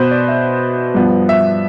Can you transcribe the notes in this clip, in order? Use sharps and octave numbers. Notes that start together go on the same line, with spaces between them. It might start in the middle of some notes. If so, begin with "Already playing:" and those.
Already playing: B2 B3 B4 C5
D5
E5
G2 F3 B3
E5